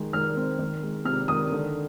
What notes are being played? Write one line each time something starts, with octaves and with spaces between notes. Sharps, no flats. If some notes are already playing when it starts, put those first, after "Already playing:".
Already playing: D#3 G#3
D#3 F6
C4
D#3
G#3
C3 F6
D#3 D#6
D3